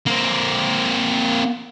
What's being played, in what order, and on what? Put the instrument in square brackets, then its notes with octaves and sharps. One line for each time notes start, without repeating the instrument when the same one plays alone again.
[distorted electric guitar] A#3 C4